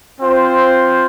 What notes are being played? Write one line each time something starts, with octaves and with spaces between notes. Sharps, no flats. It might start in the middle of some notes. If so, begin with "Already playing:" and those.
C4 F4 C5